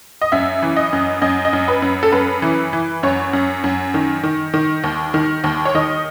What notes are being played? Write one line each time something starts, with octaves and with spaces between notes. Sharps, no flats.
D#5
F#2 E5
E3
D#5
F#2
F#2 D#5
D#5
F#2
B4
F#2
A4
F#2 B4
E3
E3
F#2 C#5
F#2
F#2
D#3
D#3
D#3
D#2
D#3
D#2
C#5
D#3 D#5